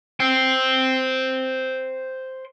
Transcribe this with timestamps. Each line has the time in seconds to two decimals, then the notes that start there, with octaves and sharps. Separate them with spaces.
0.20 C5 G5